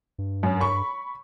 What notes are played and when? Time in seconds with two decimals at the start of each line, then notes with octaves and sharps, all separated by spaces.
0.18 G2
0.43 F#2
0.60 B5 C#6